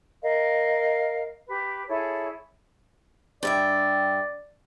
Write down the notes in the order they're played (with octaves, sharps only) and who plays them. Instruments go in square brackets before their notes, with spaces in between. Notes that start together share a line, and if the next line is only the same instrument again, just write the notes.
[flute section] A#4 D#5 F5
G4 B4
E4 G#4 A4 C#5
[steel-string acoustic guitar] G2 E5 G5 [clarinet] D5